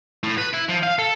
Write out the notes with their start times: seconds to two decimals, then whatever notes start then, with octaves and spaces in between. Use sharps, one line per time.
0.23 A2
0.38 B4
0.53 E4
0.68 F3
0.83 F5
0.99 A4